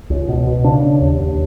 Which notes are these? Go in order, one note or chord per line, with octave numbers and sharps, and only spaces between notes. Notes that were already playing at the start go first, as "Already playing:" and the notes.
C#2
B2
B2
C#3 D4
C#3
D#2
D#2